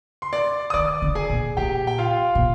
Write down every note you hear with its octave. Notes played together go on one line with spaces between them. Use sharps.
C6
D5 D6
D#6
D#3 D5 D6
D3
G#4 G#5
A#2
A#2 G4 G5
G5
F4 F5
A#2